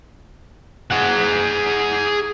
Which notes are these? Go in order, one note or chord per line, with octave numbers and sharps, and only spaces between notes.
G#4 F#5